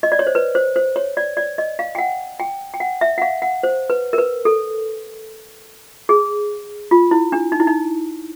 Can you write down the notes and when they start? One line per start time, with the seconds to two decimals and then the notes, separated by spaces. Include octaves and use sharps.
0.03 D#5
0.12 D5
0.19 C#5
0.27 C5
0.35 B4
0.55 C5
0.76 C5
0.96 C#5
1.17 D5
1.37 D5
1.58 D#5
1.79 F5
1.95 G5
1.98 F#5
2.40 G5
2.74 G5
2.80 F#5
3.01 E5
3.18 F#5
3.22 F5
3.42 F#5
3.63 C5
3.90 B4
4.13 A#4
4.18 B4
4.45 A4
6.09 G#4
6.91 F4
7.11 E4
7.32 D4
7.52 D#4
7.60 E4
7.67 D#4